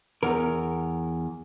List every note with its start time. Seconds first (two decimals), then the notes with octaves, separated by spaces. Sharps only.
0.23 E2 A#4